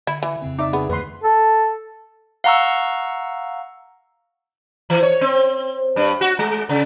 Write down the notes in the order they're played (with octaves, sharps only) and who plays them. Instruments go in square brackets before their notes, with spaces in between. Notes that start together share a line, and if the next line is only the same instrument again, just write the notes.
[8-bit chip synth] D3 [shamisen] E4
[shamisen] E3
[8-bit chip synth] F2 C#3 C4
[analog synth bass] D#4 [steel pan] D5 E5 D6
[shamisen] B3 [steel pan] G#4
[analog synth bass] F2 [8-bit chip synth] D3 E3 A3 [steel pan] B4 C6
[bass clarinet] A4
[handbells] F5 F#5 A#5 C#6 E6
[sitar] E3
C#5
C4
G2
F#4
G#3
C#3